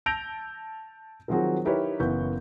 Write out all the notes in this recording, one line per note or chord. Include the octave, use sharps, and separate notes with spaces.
A5 E6 G6 A#6 D7 F7
D#3 F3 F#3 C4 F#4 G#4
D#4 E4 G4 A#4 B4 C#5
F#1 E3 B3 C#6 G6